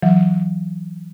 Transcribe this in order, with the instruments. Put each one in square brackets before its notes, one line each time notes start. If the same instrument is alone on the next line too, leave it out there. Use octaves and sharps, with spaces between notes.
[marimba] E3 F#3